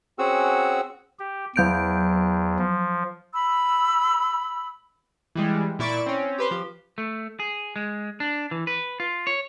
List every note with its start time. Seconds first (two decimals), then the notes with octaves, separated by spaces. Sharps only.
0.19 C4 C#4 F#4 G#4 F#5 E6
1.19 G4
1.56 E2 F#3 G6 D7
2.59 F3
3.34 B5 E6
5.35 E3 G3 G#3
5.79 A#2 E4 D5 C#6 A6 D7
6.06 C4 C#4
6.38 G4 B4 C5
6.51 F3 G4
6.98 A3
7.40 G#4
7.76 G#3
8.20 D4
8.51 E3
8.67 B4
9.00 F4
9.27 C#5